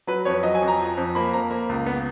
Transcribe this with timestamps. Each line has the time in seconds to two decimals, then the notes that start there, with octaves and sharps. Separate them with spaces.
0.07 F#3 B4
0.25 F2 C#5
0.43 F#3 D#5
0.55 G#5
0.62 F2
0.68 A#5
0.79 F3
0.97 F2
1.15 A#3 B5
1.33 F2 A#5
1.51 A#3
1.69 C#2
1.86 B3